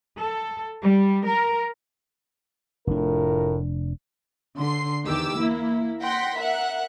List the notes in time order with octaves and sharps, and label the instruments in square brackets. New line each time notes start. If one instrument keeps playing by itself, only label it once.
[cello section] A4
G3
A#4
[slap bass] F1 D4 [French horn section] A2 F4 A#4
[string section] D3 C6 C7
E2 D#3 G4 D6 E6
A#3 E4
F#5 G5 C6 A#6 B6
A#4 E5 F#5 F#6